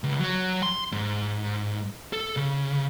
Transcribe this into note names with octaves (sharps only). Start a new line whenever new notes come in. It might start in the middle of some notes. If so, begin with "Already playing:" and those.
C#2
F#3
C6
G#2
A4
C#3